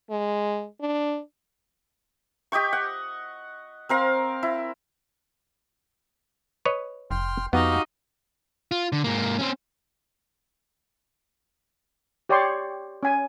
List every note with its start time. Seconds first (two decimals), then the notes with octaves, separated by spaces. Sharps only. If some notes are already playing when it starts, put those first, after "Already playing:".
0.10 G#3
0.81 D4
2.52 G4 D#5 G5 C#6
2.73 F#5
3.89 C4 A#4 F5
4.43 E4
6.65 B4 C#5 D#5
7.11 F1 G5 C6 F6
7.53 F2 B3 D#4 F#4 G4 F5
8.71 F4
8.92 D3
9.04 G#2 A#3
9.39 C4 C#4
12.29 G4 C#5 D5 G5 C6 C#6
13.03 C#4 G#5